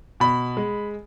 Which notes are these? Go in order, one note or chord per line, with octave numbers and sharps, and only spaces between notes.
B2 B5
G#3